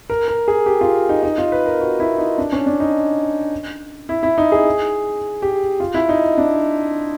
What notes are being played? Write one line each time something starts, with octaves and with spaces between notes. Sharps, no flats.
A#4
A#4
G#4
G4
F4
D#4
D#4
F4
B4
A#4
F#4
E4
D#4
D4
C#4
D4
D#4
E4
E4
D#4
G#4
G4
F4
E4
D#4
D4